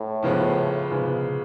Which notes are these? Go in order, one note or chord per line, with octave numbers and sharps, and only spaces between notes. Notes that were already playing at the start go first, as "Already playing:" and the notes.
Already playing: A2
E2 C#3 F3 G#3 B3
E2 C#3 F3 G#3 B3